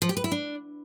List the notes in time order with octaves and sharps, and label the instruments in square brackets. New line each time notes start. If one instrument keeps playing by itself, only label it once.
[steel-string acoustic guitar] F3
G4
B4
E4
D4